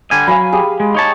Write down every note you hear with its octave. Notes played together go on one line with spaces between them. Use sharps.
D3 G3 G#5
F#3 F5 G#5 B5
G4 G#4
G#3
D#4 C#5 A5